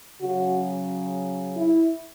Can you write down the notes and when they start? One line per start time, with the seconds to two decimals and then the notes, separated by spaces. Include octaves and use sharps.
0.21 C#3 F#3 C#4 F#4
1.57 E4